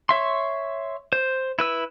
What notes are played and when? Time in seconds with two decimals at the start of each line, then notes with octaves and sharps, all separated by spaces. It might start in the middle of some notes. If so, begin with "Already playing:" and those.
0.09 C#5 E5 C6
1.13 C5
1.59 E4 B4 E6